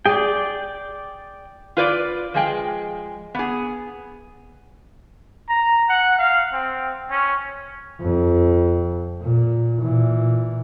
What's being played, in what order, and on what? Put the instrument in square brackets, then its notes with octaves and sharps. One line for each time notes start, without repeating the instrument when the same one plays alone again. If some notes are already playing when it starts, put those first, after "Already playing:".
[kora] G#4 [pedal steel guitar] D5 G5
[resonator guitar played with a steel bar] F4 B4 D5
F3 G#3 G5
B3 G#4
[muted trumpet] A#5
F#5
F5
C4
C#4
[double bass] F2
A#2
A#2 E3